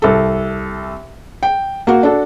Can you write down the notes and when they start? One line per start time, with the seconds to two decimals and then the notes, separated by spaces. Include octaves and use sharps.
0.02 C2 A4
1.43 G5
1.87 A#3 F#4
2.03 D4 F#4 A4